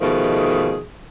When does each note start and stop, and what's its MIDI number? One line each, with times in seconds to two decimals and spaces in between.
0.01 0.79 47
0.01 0.79 51
0.01 0.79 53
0.01 0.79 57
0.01 0.79 68